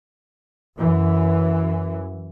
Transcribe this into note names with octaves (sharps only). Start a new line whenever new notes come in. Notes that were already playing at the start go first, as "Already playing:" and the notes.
F#2 E3